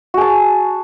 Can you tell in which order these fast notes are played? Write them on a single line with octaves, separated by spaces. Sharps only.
F#4 G#4 A5